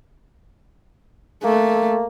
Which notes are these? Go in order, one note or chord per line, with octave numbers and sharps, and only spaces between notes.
A3 A#3